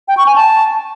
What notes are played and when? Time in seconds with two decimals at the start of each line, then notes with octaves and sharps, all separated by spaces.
0.08 G5
0.17 C#6
0.26 G#5
0.36 A5